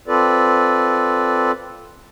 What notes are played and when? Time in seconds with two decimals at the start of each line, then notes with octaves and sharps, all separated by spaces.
0.08 C4 F4 A4 B4 D5